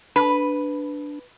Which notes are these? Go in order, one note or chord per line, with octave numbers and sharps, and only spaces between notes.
D4 B4 B5